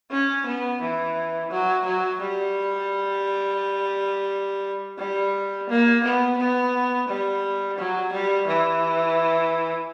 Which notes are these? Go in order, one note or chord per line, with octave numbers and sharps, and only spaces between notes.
C#4
B3
E3
F#3
F#3
G3
G3
A#3
B3
B3
G3
F#3
G3
E3